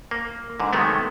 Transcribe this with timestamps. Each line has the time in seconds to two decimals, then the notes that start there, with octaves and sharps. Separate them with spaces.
0.11 A#3
0.60 G#2 D3
0.73 C3 D#3 F#3 G#3 A3 B3